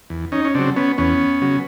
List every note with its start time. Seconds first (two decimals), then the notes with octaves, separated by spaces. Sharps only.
0.10 E2
0.32 C#4 D#4
0.45 C#4
0.54 C#3 F#3 C4 D4
0.76 B3 C#4
0.98 E2 B3 C#4
1.42 C#3 F#3